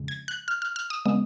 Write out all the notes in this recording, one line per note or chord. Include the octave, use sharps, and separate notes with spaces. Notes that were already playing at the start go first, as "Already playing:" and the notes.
Already playing: F2 C#3 G#3
G#6
F#6
F6
F6
F6
D#6
C#3 G#3 B3 D#6